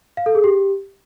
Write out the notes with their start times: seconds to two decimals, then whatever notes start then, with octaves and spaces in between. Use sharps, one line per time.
0.17 F5
0.26 A4
0.35 G#4
0.44 G4